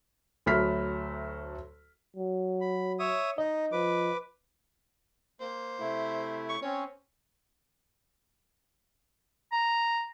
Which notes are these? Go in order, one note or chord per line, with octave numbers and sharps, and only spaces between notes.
D2 F#3 A3 B5 F6 B6
F#3
B5
C#5 E5 D#6
D#4 D#5
F3 B4 D6
A#3 C5
C3 A3 E4
C#6
C4 C#4 C#5
A#5